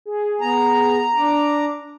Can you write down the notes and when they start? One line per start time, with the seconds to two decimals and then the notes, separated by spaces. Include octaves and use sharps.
0.05 G#4
0.41 B3 A#5
1.16 D4 D6